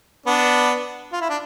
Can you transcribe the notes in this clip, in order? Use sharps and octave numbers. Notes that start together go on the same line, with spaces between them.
B3 D4
F4
E4
D4